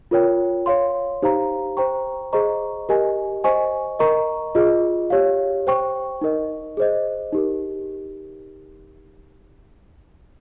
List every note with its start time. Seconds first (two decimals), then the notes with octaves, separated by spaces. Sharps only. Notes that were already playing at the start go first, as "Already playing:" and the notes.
0.11 F4 A#4 C#5 G5
0.66 C#5 F5 C6
1.22 D#4 G4 C5 F5 A#5
1.77 C5 G5 A#5 C#6
2.33 G#4 C5 D#5 A#5 C#6
2.89 G4 A#4 D#5 G#5
3.44 C5 D#5 G#5 C#6
3.99 A#4 D#5 A#5 C#6
4.55 F4 G#4 D#5
5.10 G4 C#5 F5
5.67 C5 G5 C#6
6.21 D#4 A#4 D#5
6.77 G#4 C5 D#5
7.33 D#4 G4 A#4